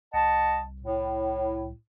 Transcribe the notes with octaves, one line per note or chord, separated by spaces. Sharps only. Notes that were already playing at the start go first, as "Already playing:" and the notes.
C2 D#5 F#5 A5
A2